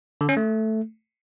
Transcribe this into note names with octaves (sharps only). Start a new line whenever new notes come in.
D3
C#4
A3